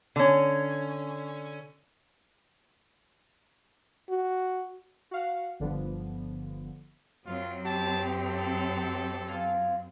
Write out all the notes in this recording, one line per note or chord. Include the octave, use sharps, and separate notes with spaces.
D3 C#4
F#4
F#4 F5 F#5
G1 D3 F3 B3
F#2 F#3 C4 F4
E4 G4 C#5 A5
A4
F4 F5 G#5